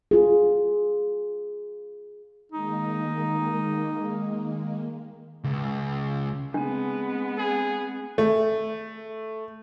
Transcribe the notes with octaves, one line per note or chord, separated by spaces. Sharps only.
F4 G#4
D#3 G#3 A#3 D#4
C#2
G#3 A3 B3 C4 D4
G#4
A3